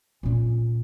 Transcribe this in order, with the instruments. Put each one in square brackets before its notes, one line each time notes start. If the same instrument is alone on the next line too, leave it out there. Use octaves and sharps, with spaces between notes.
[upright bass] A#2 C#4